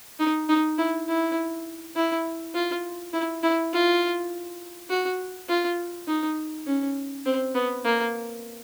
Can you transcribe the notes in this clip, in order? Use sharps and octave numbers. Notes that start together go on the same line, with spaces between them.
D#4
D#4
E4
E4
E4
F4
E4
E4
F4
F#4
F4
D#4
C#4
C4
B3
A#3